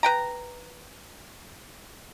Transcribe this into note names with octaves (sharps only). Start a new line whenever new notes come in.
B4 G5 A#5